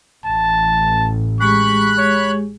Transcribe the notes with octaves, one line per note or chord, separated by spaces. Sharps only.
A1 A5
G#3 G4 G#4 B5 C#6 F#6
C#5